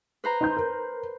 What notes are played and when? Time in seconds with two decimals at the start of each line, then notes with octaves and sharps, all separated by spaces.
0.24 B4 C5 A#5
0.41 D#4 C6 G6
0.57 A#4